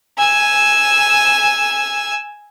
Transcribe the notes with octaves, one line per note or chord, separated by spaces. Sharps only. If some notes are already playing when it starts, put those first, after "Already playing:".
G#5 E6